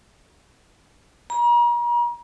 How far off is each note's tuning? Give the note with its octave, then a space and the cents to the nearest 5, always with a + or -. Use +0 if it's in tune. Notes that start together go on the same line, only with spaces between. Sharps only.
A#5 +40